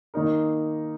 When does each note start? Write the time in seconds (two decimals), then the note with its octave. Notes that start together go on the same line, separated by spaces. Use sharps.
0.14 D#3 A#3 D#4 A#4